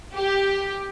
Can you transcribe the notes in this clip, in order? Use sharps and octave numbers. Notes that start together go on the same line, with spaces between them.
G4